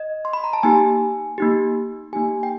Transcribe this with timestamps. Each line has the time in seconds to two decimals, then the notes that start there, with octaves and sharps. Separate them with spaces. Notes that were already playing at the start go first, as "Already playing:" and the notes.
Already playing: D#5
0.25 C6
0.33 B5
0.44 A#5
0.53 A5
0.63 A#3 D#4 G4 G#5
1.38 A#3 D#4 G4
2.13 A#3 D#4 G4 G#5
2.43 G5